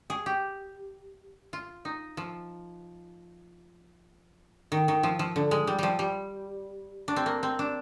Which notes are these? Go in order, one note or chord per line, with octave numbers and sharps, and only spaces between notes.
G#4
G4
F4
D#4
F3
D#3
D#3
F3
F3
D3
G#3
G3
F3 G3
G3
D4
C4
A#3
C4
D4